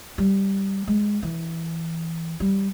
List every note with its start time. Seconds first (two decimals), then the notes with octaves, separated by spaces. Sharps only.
0.18 G3
0.87 G#3
1.23 E3
2.40 G3